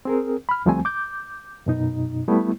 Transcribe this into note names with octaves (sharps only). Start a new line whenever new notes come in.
C4 G#4 A#4
B5 F6
D2 F3 G3 A3 C4 G#5
D6 G6
F#2 B2 D#4
G3 A3 B3 E4